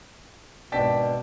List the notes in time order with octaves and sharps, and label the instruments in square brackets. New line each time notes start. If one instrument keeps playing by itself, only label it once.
[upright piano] G#1 D4 [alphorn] B2 [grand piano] G5 A5 B6